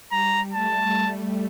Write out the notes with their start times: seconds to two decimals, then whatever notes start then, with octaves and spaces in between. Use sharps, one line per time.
0.11 G3 A#5
0.53 A3 A5